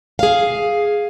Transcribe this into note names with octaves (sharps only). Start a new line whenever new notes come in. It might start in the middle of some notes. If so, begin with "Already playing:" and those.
G#4 F5